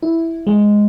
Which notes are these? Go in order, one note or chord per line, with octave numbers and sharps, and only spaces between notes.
E4
G#3